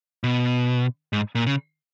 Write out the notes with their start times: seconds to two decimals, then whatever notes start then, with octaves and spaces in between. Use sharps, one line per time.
0.24 B2
1.13 G#2
1.35 A#2
1.46 C#3